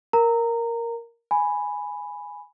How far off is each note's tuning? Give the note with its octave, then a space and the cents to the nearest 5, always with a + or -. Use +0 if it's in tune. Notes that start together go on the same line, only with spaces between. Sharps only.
A#4 +0 A#5 -20
G#5 +0 B5 +0